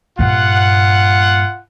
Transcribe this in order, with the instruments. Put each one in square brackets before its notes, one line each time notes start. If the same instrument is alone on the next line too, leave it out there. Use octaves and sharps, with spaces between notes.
[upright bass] G2 A#2 [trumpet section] F4 F#5